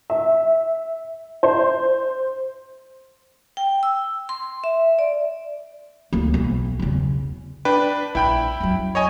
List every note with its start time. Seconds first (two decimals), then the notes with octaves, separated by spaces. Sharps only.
0.10 E5
1.43 C5
3.57 G5
3.83 E6
4.29 C6
4.64 E5
4.99 D5
6.13 D2 A#3
6.34 B1
6.79 E2 C#3
7.65 D4 B4 G5
8.15 A#1 E4 G5 B5
8.61 F#2 F#3
8.95 C#5 D#5 G#5